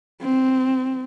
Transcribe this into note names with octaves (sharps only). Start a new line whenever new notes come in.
C4